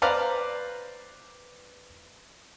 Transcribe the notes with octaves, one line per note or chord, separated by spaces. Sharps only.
B4 C5 D5 F5 A#5